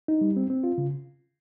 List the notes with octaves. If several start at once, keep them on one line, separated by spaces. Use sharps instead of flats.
D#4
G3
C4
C4
F4
C#3